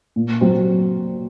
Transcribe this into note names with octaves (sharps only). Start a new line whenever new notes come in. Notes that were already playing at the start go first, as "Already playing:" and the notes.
A#2
F#3 C4 F#4 C5